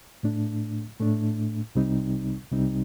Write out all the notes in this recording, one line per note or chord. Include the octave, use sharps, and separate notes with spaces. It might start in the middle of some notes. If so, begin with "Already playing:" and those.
A2 A3 D4
A2 A3 D4
C2 C3 G3 C4 D#4
C2 C3 G3 C4 D#4